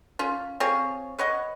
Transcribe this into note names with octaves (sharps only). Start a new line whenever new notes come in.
C#4 F4
C4 F4 G#4 C#5
B4 C#5 D#5 F#5